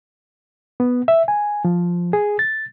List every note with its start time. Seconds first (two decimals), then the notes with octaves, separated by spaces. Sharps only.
0.80 B3
1.08 E5
1.28 G#5
1.65 F3
2.13 G#4
2.39 A6